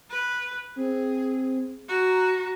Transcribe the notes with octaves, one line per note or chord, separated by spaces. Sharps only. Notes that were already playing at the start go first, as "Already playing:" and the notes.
B4
C4 G#4
F#4 A#5